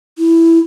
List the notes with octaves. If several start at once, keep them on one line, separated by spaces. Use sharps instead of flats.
E4